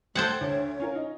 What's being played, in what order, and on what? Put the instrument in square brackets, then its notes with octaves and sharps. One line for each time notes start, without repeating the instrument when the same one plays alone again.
[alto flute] A3 [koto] A4 C5 F#5 [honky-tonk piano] G5 G#6
[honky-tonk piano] D2 [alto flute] C#5
[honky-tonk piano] C#4 F4 A#4
D#4